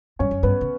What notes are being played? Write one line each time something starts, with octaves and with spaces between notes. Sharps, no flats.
G2 C#4 C#5
F#2
G2 B3 B4
C#3